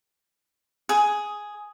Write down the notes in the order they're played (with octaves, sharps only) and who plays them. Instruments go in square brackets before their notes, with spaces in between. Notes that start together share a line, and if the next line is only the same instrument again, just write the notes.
[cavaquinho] G#4